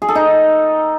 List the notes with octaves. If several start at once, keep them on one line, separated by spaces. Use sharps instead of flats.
G#4
A4
D#4